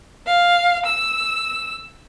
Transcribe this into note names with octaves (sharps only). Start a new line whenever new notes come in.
F5
E6